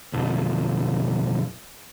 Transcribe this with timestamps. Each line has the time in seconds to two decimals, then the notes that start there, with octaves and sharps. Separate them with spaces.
0.13 B1 F2